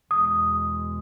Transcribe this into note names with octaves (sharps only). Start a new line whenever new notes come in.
E2 B2 G#3 D#6